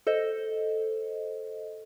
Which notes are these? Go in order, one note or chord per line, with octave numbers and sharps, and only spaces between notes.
A4 C5 D#5